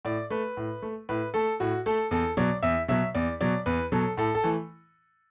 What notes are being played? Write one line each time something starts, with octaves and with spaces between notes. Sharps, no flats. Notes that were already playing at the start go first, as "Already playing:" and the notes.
A2 D5
A3 B4
A2
A3
A2 B4
A3 A4
A2 F#4
A3 A4
E2 A4
B2 F#3 D5
E2 E5
B2 F#3 E5
E2 D5
B2 F#3 D5
E2 B4
B2 F#3 A4
A2 A4
A4
E3 A3